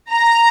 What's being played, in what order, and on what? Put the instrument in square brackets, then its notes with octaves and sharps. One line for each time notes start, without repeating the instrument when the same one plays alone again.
[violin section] A#5